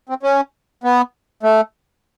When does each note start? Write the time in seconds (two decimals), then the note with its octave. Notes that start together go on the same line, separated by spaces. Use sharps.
0.09 C4
0.23 C#4
0.84 B3
1.43 A3